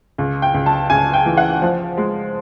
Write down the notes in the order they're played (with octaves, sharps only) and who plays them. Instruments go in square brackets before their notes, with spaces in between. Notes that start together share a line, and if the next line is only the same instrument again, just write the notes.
[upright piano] C#2
G5
C#2
A5
C#2 G#5
G5
E3
F#5
F3
G#3